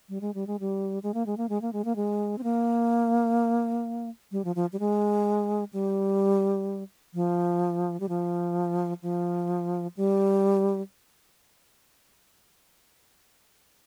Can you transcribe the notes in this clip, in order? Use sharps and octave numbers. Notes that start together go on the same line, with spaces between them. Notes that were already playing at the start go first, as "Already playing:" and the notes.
G3
G#3
G3
G#3
G3
G#3
A#3
G#3
A#3
G#3
A#3
G#3
A#3
G#3
C4
A#3
G3
F3
F3
G3
G#3
G3
F3
G3
F3
F3
G3